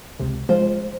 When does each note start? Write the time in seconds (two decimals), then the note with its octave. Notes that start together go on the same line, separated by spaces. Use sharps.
0.20 C#2 C3
0.49 F3 G#3 F4 C5